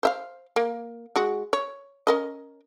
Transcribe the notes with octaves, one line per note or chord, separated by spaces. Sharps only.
C5 E5 F5
A#3
G#3 F#4
C#5
C#4 A#4 D#5